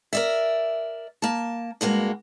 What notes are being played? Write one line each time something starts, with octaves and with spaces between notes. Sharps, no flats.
A#4 D5 E5
A#3 A5
G2 G#3 A#3 F#4